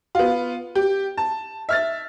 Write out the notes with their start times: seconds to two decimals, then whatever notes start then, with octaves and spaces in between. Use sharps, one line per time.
0.15 B3 F4
0.75 G4
1.17 A5
1.69 E5 F6 A6